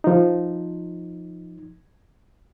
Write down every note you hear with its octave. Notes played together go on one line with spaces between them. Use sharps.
F3 D#4